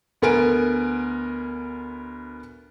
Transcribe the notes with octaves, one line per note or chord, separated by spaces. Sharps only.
D2 B3 A#4 G#5 D7